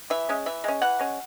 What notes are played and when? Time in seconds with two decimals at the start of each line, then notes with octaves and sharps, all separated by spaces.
0.10 E3 E5
0.29 G#3 C#4
0.46 E3 E5
0.64 G#3 C#4
0.82 E3 F#5
0.99 G#3 C#4